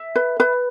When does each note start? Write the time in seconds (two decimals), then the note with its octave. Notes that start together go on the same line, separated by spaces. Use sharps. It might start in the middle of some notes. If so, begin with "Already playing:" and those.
Already playing: E5
0.16 B4
0.40 B4